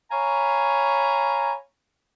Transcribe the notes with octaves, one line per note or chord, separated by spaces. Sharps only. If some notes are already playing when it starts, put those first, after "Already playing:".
C#5 F5 G#5 A#5 B5